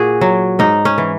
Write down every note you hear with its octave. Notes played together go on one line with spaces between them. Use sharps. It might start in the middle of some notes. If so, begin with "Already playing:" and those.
Already playing: A#2 F#4 G#4
F#3
G#2 D#4
C#4
E3